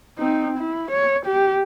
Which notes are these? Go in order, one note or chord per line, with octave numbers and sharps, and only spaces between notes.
C4 D#4
E4
C#5
G4